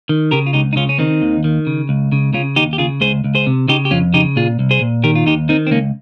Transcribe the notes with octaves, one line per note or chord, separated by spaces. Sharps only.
D#3
C#3 G4 A#4
F4
C#2 D#4 G4
D#4
C#3 C#4 F4
C#4
D#3 C4 D#4
D#2
D#3
C#3
C#2
C#3
C#3 C#4 F4
D#2 D#4 G4
G4
C#3 F4 G#4
C#2 G#4 C5
C#2
G#4 C5
C3
C#3 D#4 G4
G4
F2 C#4 F4
C#3 D#4 G4
A#2 F4 G#4
C2
G#4 C5
A#2
D#3 G4 A#4
F4
D#2 D#4 G4
D#3 C4 D#4
C4
C#2 A#3 C#4